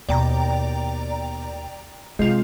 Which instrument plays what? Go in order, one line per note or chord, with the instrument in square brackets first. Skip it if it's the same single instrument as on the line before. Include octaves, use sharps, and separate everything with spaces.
[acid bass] D#2 [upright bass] B2 [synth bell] D5 G5 A#5
[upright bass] C3 [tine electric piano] G#3 [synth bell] C4 F4